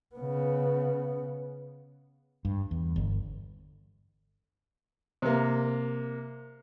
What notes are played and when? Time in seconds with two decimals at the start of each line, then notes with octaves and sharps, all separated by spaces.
0.16 C#3 B3
2.45 G2
2.71 E2
2.96 G1
5.22 C3 A#3